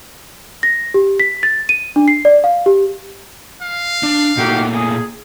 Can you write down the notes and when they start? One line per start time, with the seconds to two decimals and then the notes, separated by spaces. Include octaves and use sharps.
0.63 A#6
0.94 G4
1.20 B6
1.43 A6
1.69 D#7
1.96 D4
2.08 C7
2.25 D5
2.44 F5
2.66 G4
3.62 F5
4.03 D4
4.37 A#2 A3 A#3 D#4 F#4 G4
4.74 G#4